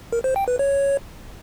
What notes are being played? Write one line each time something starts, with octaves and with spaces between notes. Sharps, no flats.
A#4
C5
G5
B4
C#5